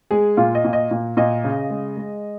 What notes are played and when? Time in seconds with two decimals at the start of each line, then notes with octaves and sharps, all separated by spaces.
0.11 G#3 G#4
0.37 A#2 F4
0.55 D#5
0.65 A#2
0.73 D#5
0.91 A#2
1.17 A#2 D#5
1.44 C#3
1.70 G#3
1.97 G#3